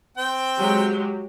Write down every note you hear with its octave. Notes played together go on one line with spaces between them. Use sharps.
C4 G5
F#3 G#3 G4